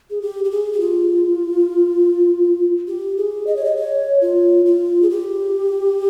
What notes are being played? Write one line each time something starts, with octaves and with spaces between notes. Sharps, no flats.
G#4
G4
G4
G#4
G4
F4
G4
G#4
D#5
C#5
D#5
C#5
F4
F4
G#4
G4